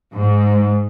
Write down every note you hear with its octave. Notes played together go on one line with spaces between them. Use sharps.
G#2